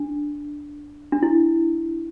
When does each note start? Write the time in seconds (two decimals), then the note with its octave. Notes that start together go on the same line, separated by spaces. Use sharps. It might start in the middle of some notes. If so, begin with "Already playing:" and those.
Already playing: D4
1.12 D4
1.23 E4